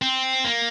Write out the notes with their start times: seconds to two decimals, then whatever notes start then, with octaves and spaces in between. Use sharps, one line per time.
0.02 C4
0.44 A#3